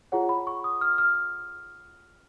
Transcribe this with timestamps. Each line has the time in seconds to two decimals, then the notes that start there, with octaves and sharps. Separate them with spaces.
0.12 F4 G#4 C#5 F#5
0.29 B5
0.47 C#6
0.64 D#6
0.81 F6
0.98 F6